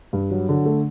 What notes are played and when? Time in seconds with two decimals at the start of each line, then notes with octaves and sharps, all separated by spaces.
0.13 G2
0.31 F#3
0.49 D3
0.65 A3